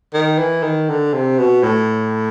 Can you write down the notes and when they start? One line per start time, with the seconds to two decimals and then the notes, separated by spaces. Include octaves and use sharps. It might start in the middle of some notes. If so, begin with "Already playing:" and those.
0.14 D#3
0.39 E3
0.63 D#3
0.89 D3
1.13 C3
1.38 B2
1.63 A2